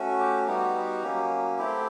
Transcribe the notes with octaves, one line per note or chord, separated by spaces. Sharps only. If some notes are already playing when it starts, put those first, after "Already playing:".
Already playing: A3 C#4 F#4
G4
G3 B3 D#4 F#4 G4
F#3 A#3 C#4
A3 C4 E4 G4